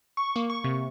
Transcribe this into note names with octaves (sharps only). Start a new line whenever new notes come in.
C#6
A#3
C#6
C3